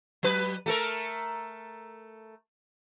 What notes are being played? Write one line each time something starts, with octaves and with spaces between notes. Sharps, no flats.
F#3 B4
A3 A4 A#4